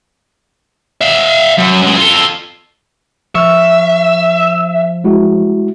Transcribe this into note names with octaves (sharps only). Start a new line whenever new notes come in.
E5 F5
F#2
F#2 G#3
F4 A4
F3 E5 C#6 F6
G#3 E4 F#4